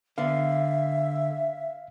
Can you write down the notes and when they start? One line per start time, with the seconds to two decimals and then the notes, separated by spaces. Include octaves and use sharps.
0.18 D3 B3 E5 F5